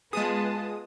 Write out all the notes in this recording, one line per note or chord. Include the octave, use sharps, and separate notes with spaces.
G#3 B3 F4 G#4 B4 A5 D#6